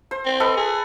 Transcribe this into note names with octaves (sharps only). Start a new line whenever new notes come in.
C5
C4
A4 B4 D#5
G#4